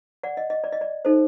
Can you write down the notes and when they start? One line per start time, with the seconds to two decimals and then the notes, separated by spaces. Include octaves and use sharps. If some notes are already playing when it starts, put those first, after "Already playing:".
0.23 D5 F#5
0.37 D#5
0.50 D#5
0.64 D5
0.72 D#5
0.81 D5
1.05 D#4 A4 C5